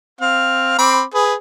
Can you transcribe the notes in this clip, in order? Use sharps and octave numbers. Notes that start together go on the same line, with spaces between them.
C4 F5
C4 B5 D6
G#4 B4